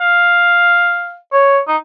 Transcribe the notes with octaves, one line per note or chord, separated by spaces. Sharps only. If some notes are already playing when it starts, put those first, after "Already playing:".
F5
C#5
D#4